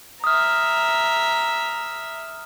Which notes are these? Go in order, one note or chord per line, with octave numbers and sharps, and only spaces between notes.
E5 A#5 D#6 F6